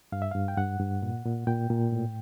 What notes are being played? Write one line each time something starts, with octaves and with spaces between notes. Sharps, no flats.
G2 F5
E5
G2 F5
G5
G2 F#5
G2
A#2
A#2
A#2 G5
A#2
A2